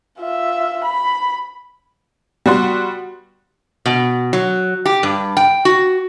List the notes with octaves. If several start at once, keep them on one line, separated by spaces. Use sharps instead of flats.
F4 E5
B5
G3 B3 F#4 C6
B2
F#3
G4
G2
G5
F#4